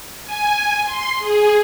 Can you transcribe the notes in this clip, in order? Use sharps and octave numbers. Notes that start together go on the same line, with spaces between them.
G#5
C6
G#4